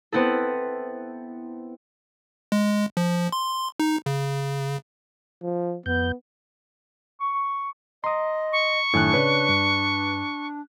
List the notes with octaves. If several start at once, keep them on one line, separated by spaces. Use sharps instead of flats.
B3 C4 E4 A4
G#3
F3
C6
D#4
C#3
F3
F2 B3 G6
C#6
D#5 A#5 C6 D#6
C#6
F#2 A2 D#3 D4 G#5 F#6
C#3 B4 C#5 D5
G2